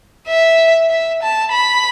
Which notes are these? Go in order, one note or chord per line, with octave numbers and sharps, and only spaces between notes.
E5
E5
A5
B5